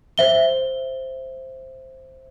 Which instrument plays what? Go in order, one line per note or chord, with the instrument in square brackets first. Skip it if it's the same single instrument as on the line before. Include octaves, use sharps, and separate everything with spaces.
[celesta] C5 E5 G7